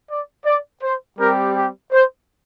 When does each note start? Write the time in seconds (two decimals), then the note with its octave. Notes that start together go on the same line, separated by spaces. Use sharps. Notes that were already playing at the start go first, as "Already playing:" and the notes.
0.08 D5
0.46 D5
0.83 C5
1.19 G3 C4 G4 A#4
1.55 G4
1.92 C5